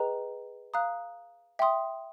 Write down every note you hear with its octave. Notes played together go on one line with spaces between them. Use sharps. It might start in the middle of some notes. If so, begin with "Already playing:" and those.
Already playing: G#4 B4 D#5 G5 A#5
F5 A#5 D#6 F#6
E5 G5 C6 D#6